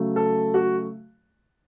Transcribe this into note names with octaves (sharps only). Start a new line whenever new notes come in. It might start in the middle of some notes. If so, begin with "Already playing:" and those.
Already playing: C#3 F#3 A3
A4
F#4